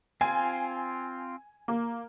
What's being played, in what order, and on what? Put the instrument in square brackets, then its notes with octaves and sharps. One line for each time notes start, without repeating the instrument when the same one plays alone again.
[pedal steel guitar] C4 F4 [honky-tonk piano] G#5
[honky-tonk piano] A#3